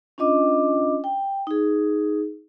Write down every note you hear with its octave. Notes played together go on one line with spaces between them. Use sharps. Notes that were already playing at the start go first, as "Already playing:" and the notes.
C#4 D4 F4 D#5 D6
G5
D#4 G#4